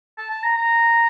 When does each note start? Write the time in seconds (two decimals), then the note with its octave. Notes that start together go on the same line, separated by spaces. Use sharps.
0.18 A5
0.30 A5
0.43 A#5
0.56 A#5